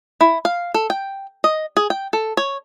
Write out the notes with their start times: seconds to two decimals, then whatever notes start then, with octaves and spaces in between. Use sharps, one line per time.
0.21 E4
0.45 F5
0.74 A4
0.90 G5
1.44 D#5
1.77 G#4
1.90 G5
2.13 A4
2.37 C#5